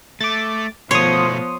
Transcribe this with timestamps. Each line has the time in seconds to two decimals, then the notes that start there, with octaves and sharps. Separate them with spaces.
0.21 A3 D6 A6
0.91 B2 F3 A3 B3 C#5 C6 D#6